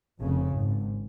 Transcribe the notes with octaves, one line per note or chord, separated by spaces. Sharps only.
F1 F2 C#3
G#1 G#2